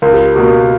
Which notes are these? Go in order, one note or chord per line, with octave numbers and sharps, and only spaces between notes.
C#2 A#4
G4
B2 A#3 G4